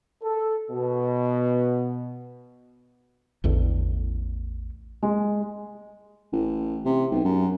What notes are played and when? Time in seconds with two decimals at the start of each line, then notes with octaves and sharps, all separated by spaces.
0.23 A4
0.71 B2
3.44 A1 E2 A2 D3
5.03 G#3
6.32 A1
6.85 C3
7.11 B1
7.25 F#2